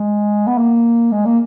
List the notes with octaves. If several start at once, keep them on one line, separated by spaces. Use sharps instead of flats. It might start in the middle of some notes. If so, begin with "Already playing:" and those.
Already playing: G#3
B3
A#3
G#3
A#3